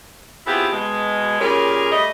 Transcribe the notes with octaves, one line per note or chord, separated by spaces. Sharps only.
B3 C4 E4 F4 G4 G#4
B2 G#3
A#2 G3 C#4 G4 G#4 A#4
G3 A3 D#5